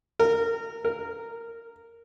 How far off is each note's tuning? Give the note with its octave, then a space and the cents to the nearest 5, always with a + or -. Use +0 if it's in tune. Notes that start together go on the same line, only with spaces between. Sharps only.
A#4 -20
A#4 -10